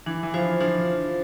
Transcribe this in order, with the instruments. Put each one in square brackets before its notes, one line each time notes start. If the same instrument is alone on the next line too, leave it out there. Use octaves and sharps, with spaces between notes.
[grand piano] E3 [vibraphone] D4
[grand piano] E3
[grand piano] F3 [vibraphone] F4 C5 F5
[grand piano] F3 [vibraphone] D4